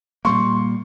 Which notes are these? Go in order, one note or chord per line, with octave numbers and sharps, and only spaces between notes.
A#2 G3 A#3 C6 C#6